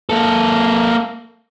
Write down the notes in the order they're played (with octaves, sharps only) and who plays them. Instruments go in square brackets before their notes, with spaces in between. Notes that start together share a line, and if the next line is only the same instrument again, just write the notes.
[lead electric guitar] A#3 A4